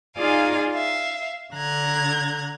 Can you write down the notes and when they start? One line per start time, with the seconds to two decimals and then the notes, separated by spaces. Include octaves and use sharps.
0.17 D#4 F4 G#4 D5 F5 G#5
0.72 E5 F5
1.54 D3 A#5 F#6 G#6